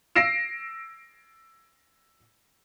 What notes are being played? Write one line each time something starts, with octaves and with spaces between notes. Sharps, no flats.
E6 A#6 C7 D7 E7